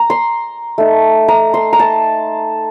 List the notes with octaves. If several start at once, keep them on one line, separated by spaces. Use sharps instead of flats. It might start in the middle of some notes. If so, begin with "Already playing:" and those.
Already playing: A#5
C6
A3 D#4
A#5
C6
A#5
A5